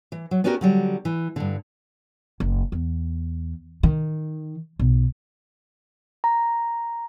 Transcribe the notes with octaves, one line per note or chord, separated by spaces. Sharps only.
E3
F#3
B3 C#4 D4 F#4 G4 A#4
D3 F#3 G3
E3
G2 D3
F#1
E2
D#3
B1
A#5